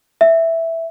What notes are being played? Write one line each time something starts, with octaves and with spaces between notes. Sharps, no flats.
E5